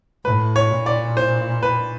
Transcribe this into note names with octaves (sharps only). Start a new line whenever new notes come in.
A2 B4
C#5
A#2
D5
C5
B4